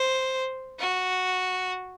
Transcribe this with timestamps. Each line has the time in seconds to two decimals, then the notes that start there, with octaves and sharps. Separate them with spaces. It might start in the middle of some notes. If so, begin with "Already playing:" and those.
Already playing: C5
0.79 F#4